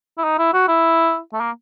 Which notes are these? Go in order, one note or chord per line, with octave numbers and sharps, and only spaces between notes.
E4
D#4
E4
F#4
E4
A3
A#3